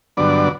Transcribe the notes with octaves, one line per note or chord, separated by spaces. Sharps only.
G2 D3 F#3 B3 D4 D5